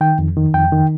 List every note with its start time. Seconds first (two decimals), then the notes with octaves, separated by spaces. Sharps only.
0.01 D#3 G5
0.19 F2
0.37 D#3
0.54 F2 G5
0.72 D#3